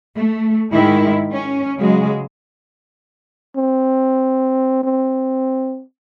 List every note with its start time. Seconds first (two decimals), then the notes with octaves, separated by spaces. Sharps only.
0.15 A3
0.73 G#2 D#3 G#3 E4
1.31 C#4
1.77 C#3 F#3 G#3
3.57 C4
4.84 C4